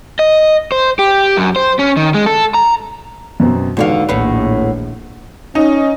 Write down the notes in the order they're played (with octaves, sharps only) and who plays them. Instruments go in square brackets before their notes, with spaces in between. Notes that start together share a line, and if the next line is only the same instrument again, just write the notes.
[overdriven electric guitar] D#5
C5
G4
F#2
C5
C#4
D#3
G#3
A4
A#5
[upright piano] F#2 B2 C4
[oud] D#2 D3 F5 [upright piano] G#2 F#4 [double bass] E3
[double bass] A#1 [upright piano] D#2 [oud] A2 B3
[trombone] C#4 [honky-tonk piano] D#4